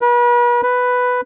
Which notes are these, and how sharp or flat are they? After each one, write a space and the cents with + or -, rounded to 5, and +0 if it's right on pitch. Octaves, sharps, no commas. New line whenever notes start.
B4 -40
B4 +5